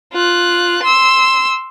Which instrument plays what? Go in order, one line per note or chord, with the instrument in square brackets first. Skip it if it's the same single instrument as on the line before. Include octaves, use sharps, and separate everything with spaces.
[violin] F4 F#6
C6 E6